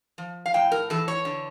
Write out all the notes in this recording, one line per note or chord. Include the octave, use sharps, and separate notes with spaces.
F3
F5
A2 G5
A#4
E3 A4
C#5
D3